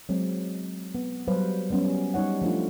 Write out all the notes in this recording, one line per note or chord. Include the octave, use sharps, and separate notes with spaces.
F#3 G#3 C4
B3
F#3 G3 B4 C5 F5
F#3 G3 B3 C#4
G3 D#4 C#5 F#5
F3 A3 D4 F4